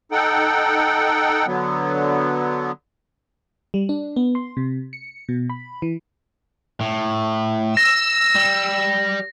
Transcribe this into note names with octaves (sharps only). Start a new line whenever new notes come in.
D#4 A4 F#5 G5
D3 F#3 B3
G3
D4
B3
C6
C3
C#7
B2
B5
E3
A2
E6 A#6
G3